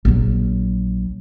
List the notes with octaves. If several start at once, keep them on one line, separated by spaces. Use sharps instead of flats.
A#1 F#3